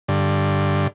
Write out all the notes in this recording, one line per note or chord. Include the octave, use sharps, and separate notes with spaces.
G2 D3